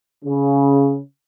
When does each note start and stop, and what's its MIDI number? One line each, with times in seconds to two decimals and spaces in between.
0.24 0.97 49